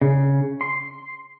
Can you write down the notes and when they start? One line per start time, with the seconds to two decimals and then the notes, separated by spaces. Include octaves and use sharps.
0.01 C#3
0.61 C6